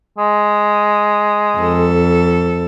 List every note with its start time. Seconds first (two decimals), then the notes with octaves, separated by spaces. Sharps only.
0.18 G#3
1.58 F2 A4